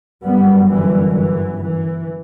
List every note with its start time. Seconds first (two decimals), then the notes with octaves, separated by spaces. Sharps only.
0.24 G1 F#2 G3 B3
0.70 E3 G3
1.17 E3
1.63 E3